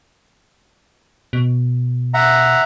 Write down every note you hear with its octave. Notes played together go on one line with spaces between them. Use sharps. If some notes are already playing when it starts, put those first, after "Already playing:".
B2
E5 F#5 A#5